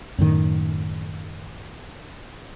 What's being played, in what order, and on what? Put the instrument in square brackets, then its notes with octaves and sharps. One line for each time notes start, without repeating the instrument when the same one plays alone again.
[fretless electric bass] F#2 A2 D#3